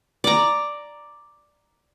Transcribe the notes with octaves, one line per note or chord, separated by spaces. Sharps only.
D5 A#5